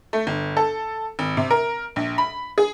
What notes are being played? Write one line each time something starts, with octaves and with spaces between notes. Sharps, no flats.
A3
G1
A4
G#1
C3
A#4
A#1
B5
G#4